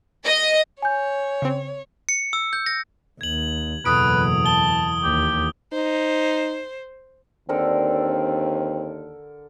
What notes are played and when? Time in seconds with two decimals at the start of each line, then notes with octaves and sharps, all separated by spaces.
0.25 D#5
0.82 C#5 G#5 G6
1.42 C#3 C4
2.09 C#7
2.33 E6
2.53 G6
2.66 A#6
3.21 D#2 G#6 F#7
3.85 F#1 E2 B2 A4 B4 D#6 D7
4.46 A5 G7
5.03 D#2 G4
5.73 D#4 C5
7.49 D#2 D3 C4 A4 A#4